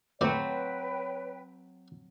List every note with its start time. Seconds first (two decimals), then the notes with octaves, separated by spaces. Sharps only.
0.21 A2 F#3 C4 B4 C#5 D5 G5